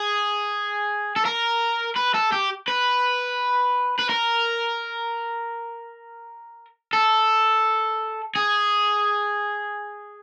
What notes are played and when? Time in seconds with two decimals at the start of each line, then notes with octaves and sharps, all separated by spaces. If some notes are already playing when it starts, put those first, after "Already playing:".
Already playing: G#4
1.16 A4
1.25 A#4
1.96 B4
2.14 A4
2.32 G4
2.68 B4
3.99 B4
4.09 A#4
6.93 A4
8.35 G#4